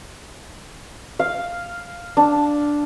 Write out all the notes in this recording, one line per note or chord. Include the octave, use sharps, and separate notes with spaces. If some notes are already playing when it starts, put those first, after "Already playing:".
F5
D4